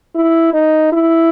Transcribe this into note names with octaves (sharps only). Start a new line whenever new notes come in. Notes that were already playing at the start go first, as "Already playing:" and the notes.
E4
D#4
E4